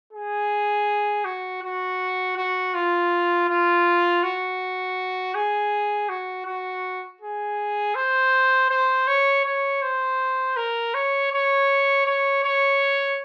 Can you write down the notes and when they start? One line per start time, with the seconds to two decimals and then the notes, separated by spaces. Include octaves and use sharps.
0.13 G#4
1.25 F#4
1.62 F#4
2.37 F#4
2.74 F4
3.48 F4
4.23 F#4
5.35 G#4
6.09 F#4
6.46 F#4
7.21 G#4
7.95 C5
8.70 C5
9.07 C#5
9.45 C#5
9.82 C5
10.57 A#4
10.94 C#5
11.32 C#5
12.06 C#5
12.43 C#5